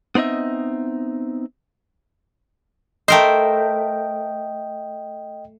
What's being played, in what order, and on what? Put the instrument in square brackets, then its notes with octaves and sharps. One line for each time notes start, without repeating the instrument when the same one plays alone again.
[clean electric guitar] B3 C4 D#4 D#5 E5
[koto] A3 A#4 C5 [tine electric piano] D#5 G5